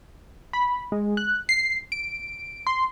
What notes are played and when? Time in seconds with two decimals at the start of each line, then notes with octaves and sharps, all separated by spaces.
0.53 B5
0.92 G#3
1.17 F#6
1.49 C7
1.92 D7
2.67 C6